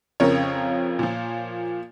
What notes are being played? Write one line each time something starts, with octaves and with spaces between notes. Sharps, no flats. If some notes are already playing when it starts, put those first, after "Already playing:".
F2 C#3 F3 A#4 C#5
A#2 F3